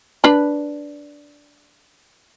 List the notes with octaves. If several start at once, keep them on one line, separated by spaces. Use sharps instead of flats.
D4 B4 B5